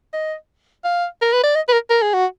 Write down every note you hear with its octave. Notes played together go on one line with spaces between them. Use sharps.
D#5
F5
A#4
B4
D5
D#5
B4
A#4
A#4
G#4
F#4